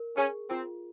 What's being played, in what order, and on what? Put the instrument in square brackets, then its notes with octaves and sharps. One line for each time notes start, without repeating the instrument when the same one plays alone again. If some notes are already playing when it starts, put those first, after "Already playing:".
Already playing: [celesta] A#4
[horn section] C#4 [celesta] G#4
[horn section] C4 [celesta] F4